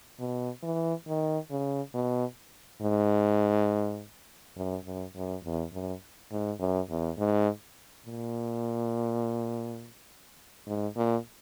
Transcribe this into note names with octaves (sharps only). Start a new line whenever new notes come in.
B2
E3
D#3
C#3
B2
G#2
F#2
F#2
F#2
E2
F#2
G#2
F#2
E2
G#2
A#2
G#2
A#2